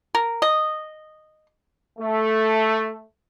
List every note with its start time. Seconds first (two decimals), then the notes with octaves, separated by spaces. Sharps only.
0.15 A#4
0.42 D#5
1.99 A3